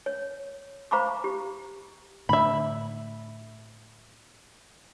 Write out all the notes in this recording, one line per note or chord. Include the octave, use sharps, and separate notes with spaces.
C#5
C5 F5 A#5 B5 C#6 D6
G4
A2 D3 E5 B5